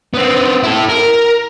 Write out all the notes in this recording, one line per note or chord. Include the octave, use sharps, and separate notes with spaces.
B3 C4
E4 A4
A#4